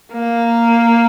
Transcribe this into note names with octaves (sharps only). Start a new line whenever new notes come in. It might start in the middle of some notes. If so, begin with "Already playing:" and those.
A#3